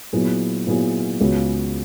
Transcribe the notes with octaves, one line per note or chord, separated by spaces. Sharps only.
A#2 F#3 B3 E4 G#4
A#2 F#3 B3 E4 G#4
C#2 C#3 G#3 B3 F#4